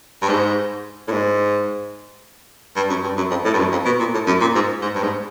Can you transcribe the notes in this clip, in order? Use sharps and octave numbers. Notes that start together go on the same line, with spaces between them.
G2
G#2
A2
G#2
G2
F#2
G2
F#2
F2
A2
G2
F#2
F2
B2
A#2
A2
F#2
A#2
G#2
G#2
G2
G#2